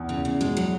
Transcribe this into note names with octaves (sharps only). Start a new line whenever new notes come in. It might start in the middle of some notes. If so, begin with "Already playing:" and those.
Already playing: E2
C#3
E2
C#3
B2 G#3
F#3